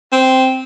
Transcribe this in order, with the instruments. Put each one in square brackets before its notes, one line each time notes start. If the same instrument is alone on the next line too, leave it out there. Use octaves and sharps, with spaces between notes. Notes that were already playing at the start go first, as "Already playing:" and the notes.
[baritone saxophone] C4